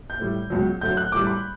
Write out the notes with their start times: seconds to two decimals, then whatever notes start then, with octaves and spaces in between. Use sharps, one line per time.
0.10 G6
0.20 A2 G3
0.50 C#2 B2 F#3
0.81 D2 D3 F#3 G6
0.97 F#6
1.12 A2 E3 G3 D6
1.27 B5